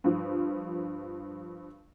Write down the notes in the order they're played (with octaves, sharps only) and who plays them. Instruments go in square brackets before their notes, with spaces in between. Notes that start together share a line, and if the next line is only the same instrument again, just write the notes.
[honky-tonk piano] G2 F3